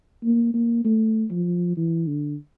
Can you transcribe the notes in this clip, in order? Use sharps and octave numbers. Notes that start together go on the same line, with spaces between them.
A#3
A#3
A3
F3
E3
D3